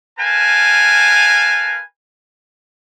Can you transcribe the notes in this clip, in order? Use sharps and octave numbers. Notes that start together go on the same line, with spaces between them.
A#4 B4 F5 G#5 A5